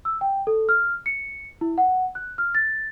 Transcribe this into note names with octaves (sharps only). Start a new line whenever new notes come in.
E6
G5
A4
F6
C#7
E4
F#5
F#6
F6
A6